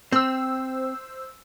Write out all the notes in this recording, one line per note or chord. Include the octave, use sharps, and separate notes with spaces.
C4 C5 E6